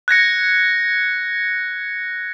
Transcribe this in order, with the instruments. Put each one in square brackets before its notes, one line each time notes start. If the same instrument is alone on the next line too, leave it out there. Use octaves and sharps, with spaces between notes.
[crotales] F#6 G#6 A#6 C#7